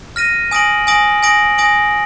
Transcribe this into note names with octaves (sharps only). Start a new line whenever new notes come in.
F6 A#6 D#7
G#5 D#6 A#6 D7 F#7
G#5 D#6 A#6 D7 F#7
G#5 D#6 A#6 D7 F#7
G#5 D#6 A#6 D7 F#7